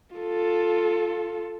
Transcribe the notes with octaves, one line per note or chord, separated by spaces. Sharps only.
F4 A4